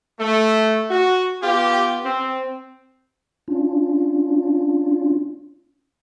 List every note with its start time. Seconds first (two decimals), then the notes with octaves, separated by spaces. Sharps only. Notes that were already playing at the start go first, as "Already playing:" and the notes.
0.19 A3
0.90 F#4
1.42 B3 F4 G4
2.04 C4
3.48 C#4 D4 F4